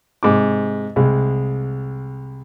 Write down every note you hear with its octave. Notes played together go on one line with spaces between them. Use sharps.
G#2 C3 D6
C2 G#3